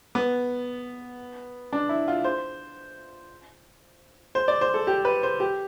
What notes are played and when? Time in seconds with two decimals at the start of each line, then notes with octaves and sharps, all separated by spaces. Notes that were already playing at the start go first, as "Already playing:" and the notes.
0.15 B3
1.73 D4
1.89 E4
2.08 F4
2.24 C5
4.35 C5
4.48 D5
4.61 C5
4.74 A4
4.87 G4
5.05 B4
5.23 C5
5.40 G4